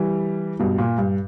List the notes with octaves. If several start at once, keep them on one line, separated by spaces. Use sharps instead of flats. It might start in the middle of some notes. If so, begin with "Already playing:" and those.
Already playing: E3 G3
G2 B2
A#2
G2